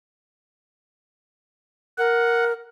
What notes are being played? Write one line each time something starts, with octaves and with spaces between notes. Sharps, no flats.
A#4 F#5